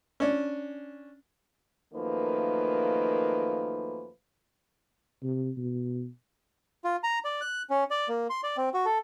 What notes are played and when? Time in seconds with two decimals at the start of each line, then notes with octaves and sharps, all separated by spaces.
0.20 C#4 D4
1.94 F#2 D#3 F3 A3 A#3 B4
5.23 C3
5.57 B2
6.84 F4
7.04 A#5
7.25 D5
7.41 F#6
7.70 C#4
7.91 D5
8.08 A#3
8.30 C6
8.44 D5
8.57 C4
8.74 F#4
8.85 A4